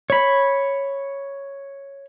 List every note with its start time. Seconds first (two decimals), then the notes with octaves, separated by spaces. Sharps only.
0.10 C#5 B5